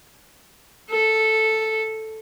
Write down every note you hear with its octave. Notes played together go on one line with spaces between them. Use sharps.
A4